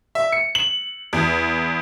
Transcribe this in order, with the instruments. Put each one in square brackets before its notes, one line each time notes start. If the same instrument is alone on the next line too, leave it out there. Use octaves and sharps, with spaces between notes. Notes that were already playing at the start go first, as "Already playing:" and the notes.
[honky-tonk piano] E5
C#7
F#7
E2